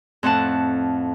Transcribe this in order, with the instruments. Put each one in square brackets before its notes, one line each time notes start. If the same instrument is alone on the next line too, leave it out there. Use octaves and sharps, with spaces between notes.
[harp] F2 A2 F#5 A5